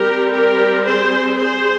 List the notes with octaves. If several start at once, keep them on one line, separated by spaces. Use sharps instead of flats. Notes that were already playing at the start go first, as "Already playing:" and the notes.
Already playing: G3 C4 G4 A#4
G4 A#4
G#4 C5
G#4 C5